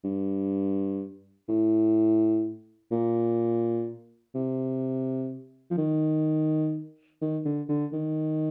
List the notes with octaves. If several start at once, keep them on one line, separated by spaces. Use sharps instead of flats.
G2
A2
A#2
C3
F3
D#3
D#3
D3
D3
D#3